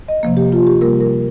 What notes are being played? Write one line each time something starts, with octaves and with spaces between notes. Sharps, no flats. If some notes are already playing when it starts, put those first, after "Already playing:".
D#5
C3 F3 A#3
G4
F4
G4
C3 G3 A#3 A#4
A#4